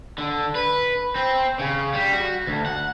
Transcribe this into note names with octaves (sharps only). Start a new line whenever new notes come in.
D3
B4
C4
C#3
G3
F#4
D2
F#5